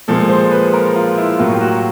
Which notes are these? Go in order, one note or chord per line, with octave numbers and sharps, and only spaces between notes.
A#2 F3 G#3 A4
C5
B4
A#4
F4
E4
A2 F#3 A#3 F4
G4
F#4